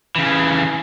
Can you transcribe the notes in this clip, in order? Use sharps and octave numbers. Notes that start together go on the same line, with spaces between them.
C#3 E3